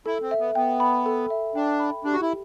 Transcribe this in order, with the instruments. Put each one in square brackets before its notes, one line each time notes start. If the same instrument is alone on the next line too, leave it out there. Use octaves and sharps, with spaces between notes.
[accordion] E4 [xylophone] A4
[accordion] C4
[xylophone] E5
[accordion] B3
[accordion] B3 [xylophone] G5
[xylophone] B5
A4
E5
[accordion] D4 [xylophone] G5
[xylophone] B5
[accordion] D4 [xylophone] G4
[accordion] F#4
E4